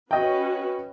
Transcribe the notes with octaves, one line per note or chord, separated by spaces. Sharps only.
C#4 F#4 B4 D#5 G5